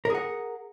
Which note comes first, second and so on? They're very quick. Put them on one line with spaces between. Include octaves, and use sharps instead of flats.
A#4 G#4 F#5